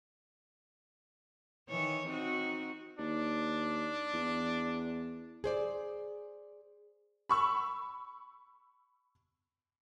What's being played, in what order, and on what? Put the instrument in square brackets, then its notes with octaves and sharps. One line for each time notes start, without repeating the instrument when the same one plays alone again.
[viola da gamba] D#3 E3 C#5
C4 D#4 F#4
[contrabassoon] D#2 [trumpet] D4
[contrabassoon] E2
[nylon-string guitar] G#4 C5 D5
[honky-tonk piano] B5 C#6 E6